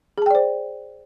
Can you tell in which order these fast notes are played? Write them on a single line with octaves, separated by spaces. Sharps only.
G#4 A5 G5 D5 C5